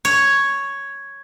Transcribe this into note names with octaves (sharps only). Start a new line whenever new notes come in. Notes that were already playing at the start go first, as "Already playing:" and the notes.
C#5